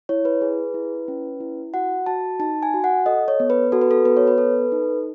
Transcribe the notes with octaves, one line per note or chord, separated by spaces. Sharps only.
E4 C#5
B4
G#4
E4
C#4
E4
F#4 F#5
F#4 A5
D#4 A5
G#5
F#4
F#5
A4 D#5
C#5
B3
B4
F#4 A4
B4
A4
B3 B4
C#5
B4
A4
D#4